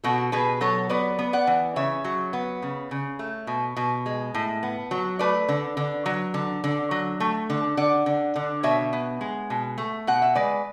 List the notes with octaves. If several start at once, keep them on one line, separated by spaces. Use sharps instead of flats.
B2 F#4 A4
B2 G#4 B4
F#3 A4 C#5
B3 B4 D5
B3
D5 F#5
E3
C#3 C#5 E5
F#3
B3
C#3
C#3
A3
B2
B2
G#3
A2
B3
F#3
A3 B4 D5
D3
D3
F#3
D3
D3
F#3
A3
D3
D3 D5 F#5
D3
D3
B2 C#5 E5
B3
G#3
B2
A3
B2 F#5
E5
G#3 B4 D5